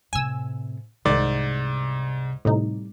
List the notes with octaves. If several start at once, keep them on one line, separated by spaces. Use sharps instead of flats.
A2 C3 G#5 E6
C2 G#2 C3 D#3 D5 A6
A2 C3 G3 D#4